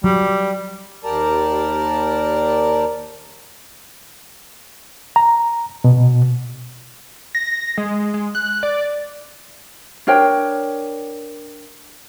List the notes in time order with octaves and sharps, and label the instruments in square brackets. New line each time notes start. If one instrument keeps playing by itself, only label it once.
[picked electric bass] F#3 [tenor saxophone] G3
[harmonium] D#2 G4 A#4 D5 A5 A#5
[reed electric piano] A#5
B2
[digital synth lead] A#6
G#3
G#3
F#6
D5
[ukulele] D4 A#4 C#5 G5